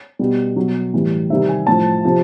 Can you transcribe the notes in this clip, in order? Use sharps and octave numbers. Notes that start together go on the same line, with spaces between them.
B2 G3
B2 F#3
A2 E3 G3
C3 D#3 G3 E5
G#5
A2 F3 A5
C3 F3